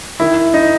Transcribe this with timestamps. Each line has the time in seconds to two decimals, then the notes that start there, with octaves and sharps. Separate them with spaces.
0.20 D#3 E4
0.54 D#4